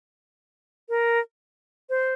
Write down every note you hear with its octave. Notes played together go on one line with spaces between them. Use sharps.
A#4
C5